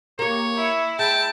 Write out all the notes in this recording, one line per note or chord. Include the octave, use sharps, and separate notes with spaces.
A#3 G4 C#5
E4
G#3 G5 A5